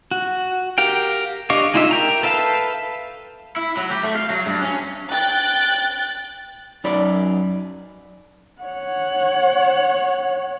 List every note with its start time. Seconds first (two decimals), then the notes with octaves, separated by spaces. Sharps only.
0.11 F#4
0.78 G4 A#4 F5 G5
1.50 D4 G4 D#5 F5 C#6
1.74 G#3 D#4 F4 D#5 E5
1.91 A#4 G5 A#5
2.23 A4 B4 E5 F5 A5
3.56 E4
3.77 F#3
3.90 G4
4.03 A3
4.15 F5
4.30 F#3
4.46 G2
4.62 C#4
5.11 G5 F#6 A6
6.84 F#2 D#4 D5 B5
8.62 C#5 F#5